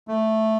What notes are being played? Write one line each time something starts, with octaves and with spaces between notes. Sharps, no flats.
A3